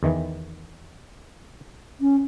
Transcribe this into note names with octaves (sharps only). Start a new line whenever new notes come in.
E2 D#3 E3
C#4